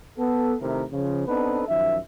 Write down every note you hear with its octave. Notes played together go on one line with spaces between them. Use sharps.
B3 A4
C3 D#3 A3 E4 A#4
C#3 F3
B3 C4 D4 D#4 A4 B4
F#2 D#3 F3 E5